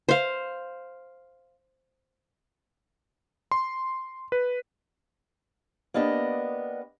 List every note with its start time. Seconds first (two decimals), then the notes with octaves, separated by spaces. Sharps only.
0.09 C5 F5
3.51 C6
4.32 B4
5.94 A#3 B3 D4 G4 D#5